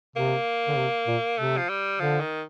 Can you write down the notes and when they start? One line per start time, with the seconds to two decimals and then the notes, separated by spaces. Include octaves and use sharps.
0.16 C3 A#3
0.68 D3
0.78 C3
1.07 A#2
1.38 C3 A3
1.57 F3
1.69 G3
2.00 D3 F3
2.20 D#3